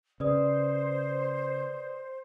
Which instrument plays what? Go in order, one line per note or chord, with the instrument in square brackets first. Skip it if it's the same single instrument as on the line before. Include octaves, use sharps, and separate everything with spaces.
[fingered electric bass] C#3 [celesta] B4 D5 D#6 [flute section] C5